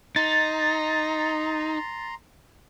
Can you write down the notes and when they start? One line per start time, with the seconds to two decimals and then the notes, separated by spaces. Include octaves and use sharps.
0.16 D#4 A#5 C6 A6